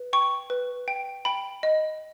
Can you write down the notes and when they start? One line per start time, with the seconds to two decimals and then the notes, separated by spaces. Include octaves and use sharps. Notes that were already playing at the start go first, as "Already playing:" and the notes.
Already playing: B4
0.13 G5 C#6
0.50 B4
0.88 G5
1.25 G5 B5
1.63 D#5